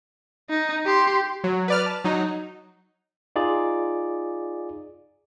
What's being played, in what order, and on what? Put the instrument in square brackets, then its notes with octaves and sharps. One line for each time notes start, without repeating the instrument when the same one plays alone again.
[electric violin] D#4
G4 C6
[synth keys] F#3
B4 D5 F6
A5
F#3 D#4
[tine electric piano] D#4 F4 G#4 D5